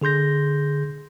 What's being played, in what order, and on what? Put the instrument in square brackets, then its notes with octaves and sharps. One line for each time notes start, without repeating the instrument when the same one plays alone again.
[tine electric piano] D3 G#4 C6 G6 A#6